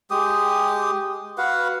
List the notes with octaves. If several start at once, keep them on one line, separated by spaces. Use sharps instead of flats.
G#3 G4 D#6
F#4 B4 F5 F#5